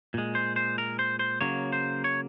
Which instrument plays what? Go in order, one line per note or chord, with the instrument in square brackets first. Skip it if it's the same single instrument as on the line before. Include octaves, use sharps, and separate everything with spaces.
[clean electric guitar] A#2 G#3
C5
C5
A#4
C5
C5
C#3 F#3 A#3 C#5
C5
C#5